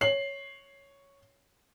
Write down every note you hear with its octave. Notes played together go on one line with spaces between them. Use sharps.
C#5 C7 F#7